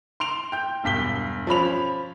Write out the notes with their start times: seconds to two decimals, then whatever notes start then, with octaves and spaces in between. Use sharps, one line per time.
0.20 C6 D7 F7
0.52 G5 G6
0.84 E1 G2 B6 G7
1.47 F3 C#4 B5 F7